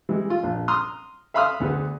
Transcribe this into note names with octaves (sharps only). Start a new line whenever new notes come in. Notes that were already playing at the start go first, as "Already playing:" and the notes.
E3 G3 G#3
F4
A#1
A#5 C6 D#6 F6
E5 F5 B5 C6 D#6 F6
D2 B3 G#4